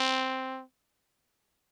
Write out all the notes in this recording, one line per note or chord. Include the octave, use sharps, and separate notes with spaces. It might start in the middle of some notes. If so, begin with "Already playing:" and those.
Already playing: C4